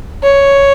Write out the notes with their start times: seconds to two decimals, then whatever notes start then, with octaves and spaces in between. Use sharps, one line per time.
0.23 C#5